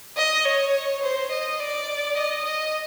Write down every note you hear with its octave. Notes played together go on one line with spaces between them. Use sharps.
D#5
C#5
C5
D#5
D5
D#5
D#5